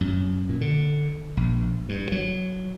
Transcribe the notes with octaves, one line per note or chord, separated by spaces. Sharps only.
F#2
A#2
D3
A#1
G2
F#3